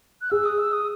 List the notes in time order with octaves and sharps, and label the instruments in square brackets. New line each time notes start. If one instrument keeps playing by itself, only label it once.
[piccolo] F#6
[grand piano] G#4 [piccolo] E6
[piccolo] D#6
E6
D#6